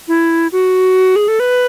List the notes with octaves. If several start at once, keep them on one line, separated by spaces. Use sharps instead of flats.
E4
F#4
G#4
A4
B4